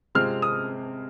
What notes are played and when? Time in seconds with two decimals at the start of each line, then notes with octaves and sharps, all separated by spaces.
0.15 C3 G#3 C4 F4 F6
0.42 D#6